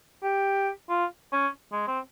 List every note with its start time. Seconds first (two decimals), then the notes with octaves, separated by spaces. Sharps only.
0.23 G4
0.89 F4
1.32 C#4
1.72 G#3
1.88 C4